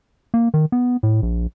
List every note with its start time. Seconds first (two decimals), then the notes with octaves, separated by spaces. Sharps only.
0.34 A#3
0.54 D#3
0.72 B3
1.03 A2
1.22 A#1